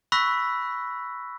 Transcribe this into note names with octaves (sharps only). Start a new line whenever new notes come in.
B5 C#6 E6 F#6 A#6 B6